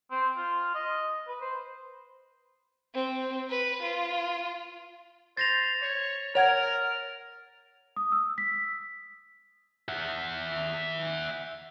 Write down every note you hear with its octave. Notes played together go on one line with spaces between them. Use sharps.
C4
F4
D#5
B4
C5
C4
B4
F4
C5 A6 A#6 F7
C#5
A#4 C#5 F#5 G#6 F7
D#6
E6
B6
E5 F#5